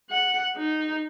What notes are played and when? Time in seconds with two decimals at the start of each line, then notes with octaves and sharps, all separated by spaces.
0.10 F#5
0.57 D#4